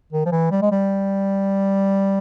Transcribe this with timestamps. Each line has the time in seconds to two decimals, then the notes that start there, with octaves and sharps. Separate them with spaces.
0.13 D#3
0.26 F3
0.32 E3
0.51 G3
0.62 G#3
0.72 G3